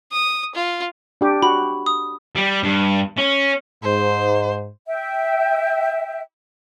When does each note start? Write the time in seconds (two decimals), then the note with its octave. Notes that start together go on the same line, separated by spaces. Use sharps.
0.12 D#6
0.55 F4
1.21 D4 G4
1.42 F#4 B5
1.86 D#6
2.36 G3
2.63 G2
3.18 C#4
3.84 G#2 C5
4.86 E5 G5